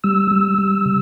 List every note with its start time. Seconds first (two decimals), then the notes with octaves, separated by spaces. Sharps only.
0.04 G3 E6
0.31 G3
0.58 G3
0.86 C#3